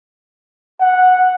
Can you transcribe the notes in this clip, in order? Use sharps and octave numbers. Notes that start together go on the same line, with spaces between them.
F#5